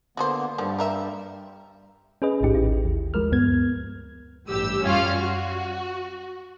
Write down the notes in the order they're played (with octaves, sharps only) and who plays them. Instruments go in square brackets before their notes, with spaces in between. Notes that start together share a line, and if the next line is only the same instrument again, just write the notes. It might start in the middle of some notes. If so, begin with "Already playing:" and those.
[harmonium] D3 A#3 B3 [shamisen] F#4 G#4 C5
[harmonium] G2 G3 [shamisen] D3 D#3 F3
[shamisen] A#3 A#4 E5
[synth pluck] C#4 G#4 B4 D#5
A1 D2 G#2 D#4 G4
A1 E4
D#2
F3 G#3 A#4 F6
D2 G2 B3 G#6
[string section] A1 G2 G4 E6
F#2 G3 C#4 F4 F5
F#4